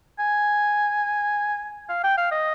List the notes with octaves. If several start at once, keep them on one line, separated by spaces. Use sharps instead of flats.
G#5
F5
G5
F5
D#5